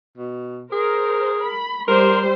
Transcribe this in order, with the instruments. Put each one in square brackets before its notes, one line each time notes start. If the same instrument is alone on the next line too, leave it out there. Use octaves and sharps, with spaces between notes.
[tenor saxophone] B2
[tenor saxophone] G#4 [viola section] A#4 C5
[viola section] B5
[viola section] G3 C5 C6 [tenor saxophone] A#4